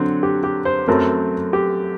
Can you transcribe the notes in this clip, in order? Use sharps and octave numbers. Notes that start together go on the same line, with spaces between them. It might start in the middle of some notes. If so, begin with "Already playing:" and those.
Already playing: D3 F#3 C4
G4
G4
C5
F#2 F#3 A3 C4 A#4
G4